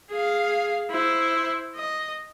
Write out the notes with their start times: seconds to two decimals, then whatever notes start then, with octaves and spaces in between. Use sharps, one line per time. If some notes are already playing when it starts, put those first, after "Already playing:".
0.11 G#4 F5
0.90 E4 C5
1.76 D#5